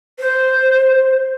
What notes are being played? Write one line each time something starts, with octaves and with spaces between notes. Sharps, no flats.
C5